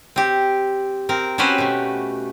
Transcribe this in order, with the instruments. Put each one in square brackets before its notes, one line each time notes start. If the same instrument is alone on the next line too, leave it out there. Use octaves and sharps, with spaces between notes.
[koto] C4 G4
C4 A#4
C4 C#4 F#4 G4 B4 C5
B2 A3